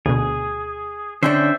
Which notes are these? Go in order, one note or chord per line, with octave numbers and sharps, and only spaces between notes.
D2 B2 G#4
D3 C#4 D4 C5 E5 G5